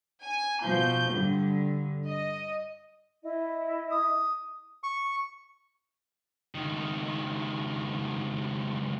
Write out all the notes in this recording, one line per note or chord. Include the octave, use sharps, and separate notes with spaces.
G#5
B2 F3 G6
G2 D3
D#5
E4 D#5
D#6
C#6
C#2 D#3